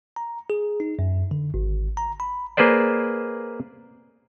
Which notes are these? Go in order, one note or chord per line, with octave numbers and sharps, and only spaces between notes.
A#5
G#4
D#4
F#2
D3
G#1
A#5
B5
A#3 G#4 B4 C5 D5